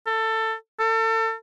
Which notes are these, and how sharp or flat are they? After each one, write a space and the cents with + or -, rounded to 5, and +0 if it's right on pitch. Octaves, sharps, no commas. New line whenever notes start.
A4 +20
A4 +35